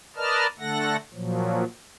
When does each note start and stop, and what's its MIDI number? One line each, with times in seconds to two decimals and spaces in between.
0.16 0.47 70
0.16 0.47 71
0.16 0.47 74
0.16 0.47 75
0.16 0.47 81
0.16 0.47 89
0.59 0.96 50
0.59 0.96 57
0.59 0.96 69
0.59 0.96 78
0.59 0.96 94
1.13 1.64 46
1.13 1.64 53
1.13 1.64 54